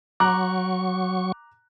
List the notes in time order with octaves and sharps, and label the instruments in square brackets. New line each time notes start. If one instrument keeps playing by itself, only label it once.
[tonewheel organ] F#3 C#6 [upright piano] A#5 D6 F#6